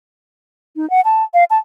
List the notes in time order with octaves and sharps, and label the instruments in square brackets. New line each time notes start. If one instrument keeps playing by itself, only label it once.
[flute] D#4
F#5
A5
F5
A5